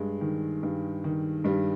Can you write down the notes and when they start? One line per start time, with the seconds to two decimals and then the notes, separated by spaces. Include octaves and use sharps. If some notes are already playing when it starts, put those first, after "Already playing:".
Already playing: G2 G#3
0.21 D#3
0.63 G2
1.04 D#3
1.44 G2 G3